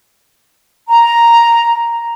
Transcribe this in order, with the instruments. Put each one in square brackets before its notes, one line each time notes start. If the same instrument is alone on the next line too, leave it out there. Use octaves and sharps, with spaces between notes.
[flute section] A#5